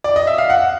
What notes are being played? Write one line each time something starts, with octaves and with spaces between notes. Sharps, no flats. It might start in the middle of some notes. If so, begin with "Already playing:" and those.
D5
D#5
E5
F5
F#5